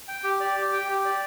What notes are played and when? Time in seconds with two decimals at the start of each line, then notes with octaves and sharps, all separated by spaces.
0.08 G5
0.24 G4
0.40 D5
0.56 G4
0.73 G5
0.89 G4
1.05 D5